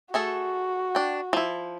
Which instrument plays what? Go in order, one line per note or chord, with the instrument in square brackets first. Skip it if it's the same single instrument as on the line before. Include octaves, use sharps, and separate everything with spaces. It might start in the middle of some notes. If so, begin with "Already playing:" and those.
[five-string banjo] A3 G#4 A4 [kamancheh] F#4
[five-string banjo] D4 G5
F3 E4